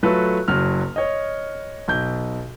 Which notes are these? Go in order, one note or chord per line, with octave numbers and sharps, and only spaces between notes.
F#3 A3 F4 A4 B4
F#1 F#3 F6
C#5 D#5
B1 G6